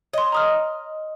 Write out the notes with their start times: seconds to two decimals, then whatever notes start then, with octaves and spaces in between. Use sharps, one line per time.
0.13 C#5 D#5 C6
0.32 A#5 D#6 F6